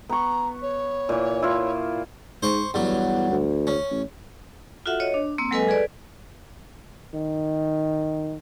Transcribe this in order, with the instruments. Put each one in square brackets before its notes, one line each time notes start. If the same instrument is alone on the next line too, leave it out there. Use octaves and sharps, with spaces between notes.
[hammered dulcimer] B3 C#6 [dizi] A#5
[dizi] C#5
[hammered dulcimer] A#2 E3
E4 F4
[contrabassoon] G#2 [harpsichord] C5 C#6
[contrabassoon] E2 [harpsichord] G2 F#3
[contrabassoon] D2
[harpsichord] C#4
[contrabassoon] A1
[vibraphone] F4 F#4 A4 E5 F#5
C#5 D#5
D4
A#3 C4 E6
F#3 G#3 A4 B4 D#5 G#5
G#4 A4 B4 D5
[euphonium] D#3